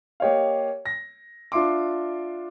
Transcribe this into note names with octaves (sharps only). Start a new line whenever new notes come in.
A#3 G4 C#5 D#5 F5
A#6
D4 F4 E5 C6 D6